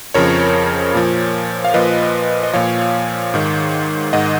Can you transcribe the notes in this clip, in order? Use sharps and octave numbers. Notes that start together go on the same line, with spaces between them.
F2 C#3 F3 A#4 C#5
A#2 F3
F5
A#2 F3 B4 D#5
D#5
A#2 F3 C#5 F5
G#2 D#3
G#2 D#3 D#5 F#5